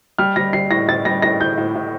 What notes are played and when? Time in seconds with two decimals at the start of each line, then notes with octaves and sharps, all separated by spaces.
0.18 G3 F6
0.36 G3 A#6
0.53 G3 C7
0.71 A2 A#6
0.88 A2 A6
1.05 G3 A#6
1.22 A2 A#6
1.40 A2 G6
1.58 A2
1.75 A2